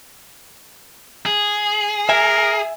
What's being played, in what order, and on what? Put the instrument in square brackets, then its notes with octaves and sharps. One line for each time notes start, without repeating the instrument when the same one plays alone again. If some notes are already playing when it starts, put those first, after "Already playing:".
[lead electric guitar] G#4
[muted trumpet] A#4 [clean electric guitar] E5 G#5